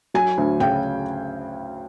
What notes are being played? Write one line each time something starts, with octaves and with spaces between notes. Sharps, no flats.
F#3 G#5
D2
C#3 G5